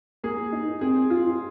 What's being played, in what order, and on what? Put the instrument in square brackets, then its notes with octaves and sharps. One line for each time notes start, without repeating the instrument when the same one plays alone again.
[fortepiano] A#3 [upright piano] G#4
[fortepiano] D#4
[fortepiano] C4 [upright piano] G#4
[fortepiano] F4